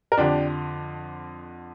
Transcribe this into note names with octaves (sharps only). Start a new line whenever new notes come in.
A#4
F2 D3 F3 D4 G4